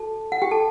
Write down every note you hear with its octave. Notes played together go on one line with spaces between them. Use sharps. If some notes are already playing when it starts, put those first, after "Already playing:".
Already playing: F#4 A4 A5
F#5
G4 G5
A4 A5